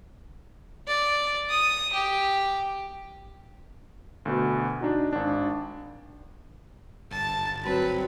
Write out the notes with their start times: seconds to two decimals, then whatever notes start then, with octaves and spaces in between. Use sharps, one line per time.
0.87 D5
1.50 D#6
1.93 G4
4.25 D2 B2
4.81 D4 D#4 F#4
5.13 G#1 D4
7.11 G1 A5
7.64 F#3 C4 B4